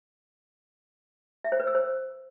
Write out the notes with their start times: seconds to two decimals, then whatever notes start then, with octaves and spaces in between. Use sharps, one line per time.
1.44 E5
1.52 C5
1.60 B4
1.67 E6
1.75 C5